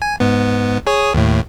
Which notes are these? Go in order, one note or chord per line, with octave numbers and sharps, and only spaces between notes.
G#5
G#2 B3
G#4 C#5 D#6
D#2 A2